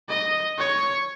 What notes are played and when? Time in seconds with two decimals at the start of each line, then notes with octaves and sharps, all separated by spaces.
0.09 D#5
0.58 C#5